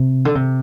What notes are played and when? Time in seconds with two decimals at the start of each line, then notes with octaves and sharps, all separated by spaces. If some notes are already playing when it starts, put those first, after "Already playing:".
Already playing: C3
0.25 D3
0.35 C3